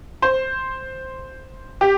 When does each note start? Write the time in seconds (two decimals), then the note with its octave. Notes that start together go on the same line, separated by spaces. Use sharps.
0.22 C5
1.81 G4